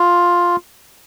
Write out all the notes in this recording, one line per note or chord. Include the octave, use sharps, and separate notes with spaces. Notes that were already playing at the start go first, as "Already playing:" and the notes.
Already playing: F4